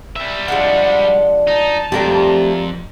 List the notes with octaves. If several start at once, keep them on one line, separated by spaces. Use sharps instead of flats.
G3 E5
F3 G#3 D4 F#5
D#4 A5
F2 F3 A3 G4 A#4 D5